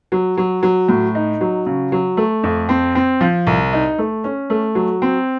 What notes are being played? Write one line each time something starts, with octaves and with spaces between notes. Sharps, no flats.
F#3
F#3
F#3
A2
D#4
F#3
C#3
F#3
A3
F2
C4
C4
F3
C2
D#4
A3
C#4
A3
F#3
C4